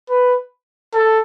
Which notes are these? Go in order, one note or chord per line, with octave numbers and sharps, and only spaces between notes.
B4
A4